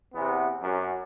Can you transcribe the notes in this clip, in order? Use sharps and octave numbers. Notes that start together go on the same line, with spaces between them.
E2 C3 B3
F#2